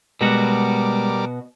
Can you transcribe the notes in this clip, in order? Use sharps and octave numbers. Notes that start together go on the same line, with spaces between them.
B2 G3 G#3 F#4 A#4 D6